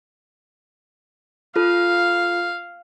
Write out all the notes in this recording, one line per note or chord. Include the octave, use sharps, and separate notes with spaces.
F4 A4 F5